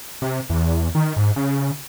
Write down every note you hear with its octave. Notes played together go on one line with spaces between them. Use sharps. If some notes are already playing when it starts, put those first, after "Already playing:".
C3
E2
D#3
G#2
C#3